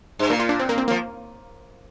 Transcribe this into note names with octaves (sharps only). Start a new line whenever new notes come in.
G2
A#2 A#3
F4
D4
C4
A#3
C4
A#3
F3